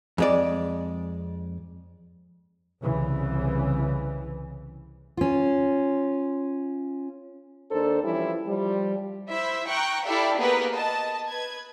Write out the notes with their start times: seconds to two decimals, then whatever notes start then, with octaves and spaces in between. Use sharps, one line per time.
0.18 F2 G#3 D5
2.81 C2 C#3 E3
5.17 C#4 F4
7.71 D#2 D4 A4 A#4 C5
8.03 E3 F3 G3 C#4 E4
8.48 F3 G3
9.28 E4 C5 E5
9.67 G5 A#5 C#6 F#6
10.06 E4 G4 A4 D5 E5 F5
10.37 A#3 B3 G4 G#4 A#4 B4
10.73 D#5 A5
11.28 B4 G#6